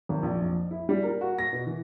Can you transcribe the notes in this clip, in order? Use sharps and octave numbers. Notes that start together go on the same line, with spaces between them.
G#1
A#1
F2
E4
G3
A#4
F#4
A#6
B2
E3